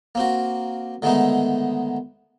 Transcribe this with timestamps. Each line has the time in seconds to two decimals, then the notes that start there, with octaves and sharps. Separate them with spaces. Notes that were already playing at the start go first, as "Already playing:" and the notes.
0.15 A#3 C4 F#4
1.02 D3 D#3 G#3 A3 B3 D#4